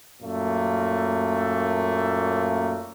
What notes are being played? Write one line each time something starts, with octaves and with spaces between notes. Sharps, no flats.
F#2 A#2 A3 A#3